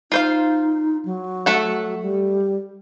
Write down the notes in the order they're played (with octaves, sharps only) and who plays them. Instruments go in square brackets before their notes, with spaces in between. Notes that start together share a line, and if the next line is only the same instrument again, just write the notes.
[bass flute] D#4 [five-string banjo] F4 C5 F5
[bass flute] F#3
[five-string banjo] A3 A4 F#5
[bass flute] G3